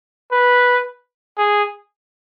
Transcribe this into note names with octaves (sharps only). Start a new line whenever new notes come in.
B4
G#4